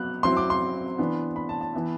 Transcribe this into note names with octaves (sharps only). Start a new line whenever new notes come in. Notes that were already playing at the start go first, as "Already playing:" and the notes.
Already playing: F#3 B3 F#6
F#3 C4 E4 C6
D6
C6
E3 B3 D4
B5
A5
A5
E3 B3 E4